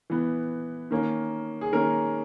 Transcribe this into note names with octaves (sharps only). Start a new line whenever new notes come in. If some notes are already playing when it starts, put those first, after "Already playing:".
E3 B3
D#3 A#3 C#4
G#4
D#3 A#3 C#4 A#4